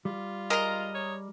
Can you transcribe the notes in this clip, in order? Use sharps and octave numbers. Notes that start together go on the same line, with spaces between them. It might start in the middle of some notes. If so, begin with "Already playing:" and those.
G3 F4
G#3 A#4 D#5 A#5
C#5